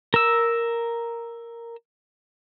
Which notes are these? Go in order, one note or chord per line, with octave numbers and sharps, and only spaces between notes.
A#4 E6